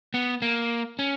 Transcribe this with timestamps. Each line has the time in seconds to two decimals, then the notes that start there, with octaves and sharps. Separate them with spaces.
0.14 B3
0.42 A#3
0.99 C#4